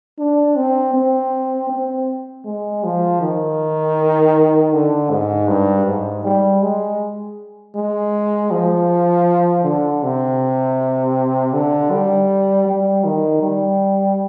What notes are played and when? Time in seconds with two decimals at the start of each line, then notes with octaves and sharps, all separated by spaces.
0.19 D4
0.56 C4
0.94 C4
1.70 C4
2.45 G#3
2.84 F3
3.22 D#3
4.73 D3
5.11 G#2
5.49 G2
5.86 G#2
6.24 G3
6.63 G#3
7.75 G#3
8.51 F3
9.64 D3
10.03 C3
11.54 D3
11.92 G3
12.68 G3
13.05 D#3
13.42 G3